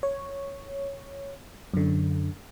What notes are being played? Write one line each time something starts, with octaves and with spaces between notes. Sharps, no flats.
C#5
F#2 D3